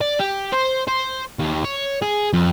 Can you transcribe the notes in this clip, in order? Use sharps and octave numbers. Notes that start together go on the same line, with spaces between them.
D5
G4
C5
C5
D#2
C#5
G#4
F2